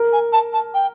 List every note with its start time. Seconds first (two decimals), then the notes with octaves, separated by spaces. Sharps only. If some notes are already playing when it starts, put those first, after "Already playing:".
Already playing: A#4
0.13 G#5
0.33 A5
0.53 A5
0.74 G5